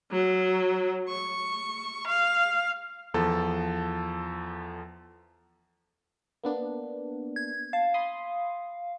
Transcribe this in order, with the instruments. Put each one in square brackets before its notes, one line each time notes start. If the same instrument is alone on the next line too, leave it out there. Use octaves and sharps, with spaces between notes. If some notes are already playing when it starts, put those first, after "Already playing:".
[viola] F#3
C#6
F5
[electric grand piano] E2 F3 A4 A5
[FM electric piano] A#3 B3 D4
[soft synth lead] G#6
[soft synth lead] F5 [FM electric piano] A5
[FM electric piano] B5 C6 D#6